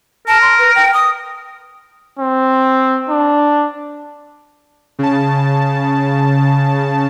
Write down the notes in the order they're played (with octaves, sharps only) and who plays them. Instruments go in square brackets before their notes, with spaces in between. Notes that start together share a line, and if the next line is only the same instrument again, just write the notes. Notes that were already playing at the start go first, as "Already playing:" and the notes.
[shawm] A#4 [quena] A5
[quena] C6
B4
G5
D#6
[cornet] C4
D4
[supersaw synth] C#3 A5